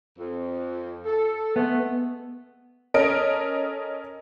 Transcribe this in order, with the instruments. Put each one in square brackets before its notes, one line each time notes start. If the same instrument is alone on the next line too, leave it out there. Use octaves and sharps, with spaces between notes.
[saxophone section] F2
A4
[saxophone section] G#3 A3 [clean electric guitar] B3
[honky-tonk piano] C#4 A4 A#4 D#5 D7